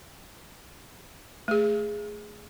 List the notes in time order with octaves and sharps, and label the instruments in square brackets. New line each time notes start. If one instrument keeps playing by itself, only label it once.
[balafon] A3 G#4